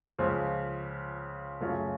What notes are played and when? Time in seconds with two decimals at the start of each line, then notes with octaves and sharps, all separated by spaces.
0.18 C#2 C#3 F3
1.61 F#2 C#3 A3 C#4 F4